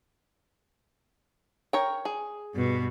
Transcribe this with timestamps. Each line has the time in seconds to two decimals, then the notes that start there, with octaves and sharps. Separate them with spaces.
1.73 A#4 C#5 G5
2.05 G#4
2.55 G2 B2